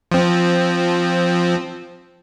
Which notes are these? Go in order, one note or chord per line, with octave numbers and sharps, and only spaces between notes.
F3 C4